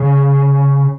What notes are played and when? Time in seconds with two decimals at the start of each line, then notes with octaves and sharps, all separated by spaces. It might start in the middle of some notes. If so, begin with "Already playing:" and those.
Already playing: C#3